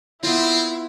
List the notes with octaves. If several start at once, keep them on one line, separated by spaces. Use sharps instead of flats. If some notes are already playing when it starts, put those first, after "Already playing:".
B3 C4 E4 F4